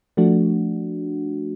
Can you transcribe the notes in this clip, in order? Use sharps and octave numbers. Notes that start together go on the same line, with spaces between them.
F3 A3 D4 F#4